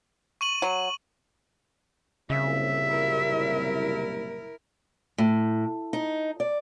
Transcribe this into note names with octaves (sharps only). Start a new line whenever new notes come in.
C#6 D#7 F#7
F#3
F#1 C2 A#2 C#3 E5
E4 A#4
A2
D#4
D5